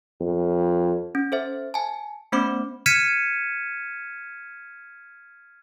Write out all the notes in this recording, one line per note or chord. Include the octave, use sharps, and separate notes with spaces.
F2
C#4
A4 C5 E5
G#5 A5
A3 B3 C#4 C5 B5 D6
F6 G#6 B6 C#7 D#7 E7